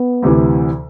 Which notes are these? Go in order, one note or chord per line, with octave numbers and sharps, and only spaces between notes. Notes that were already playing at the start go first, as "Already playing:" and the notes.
Already playing: B3
D2 C3 E3